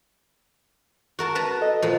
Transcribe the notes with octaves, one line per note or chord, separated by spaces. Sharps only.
F#4 A#4 A5
B4 A5 A#5
A4 D#5
A#2 F3